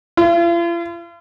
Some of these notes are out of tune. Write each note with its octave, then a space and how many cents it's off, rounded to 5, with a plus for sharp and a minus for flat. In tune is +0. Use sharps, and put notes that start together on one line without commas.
F4 -45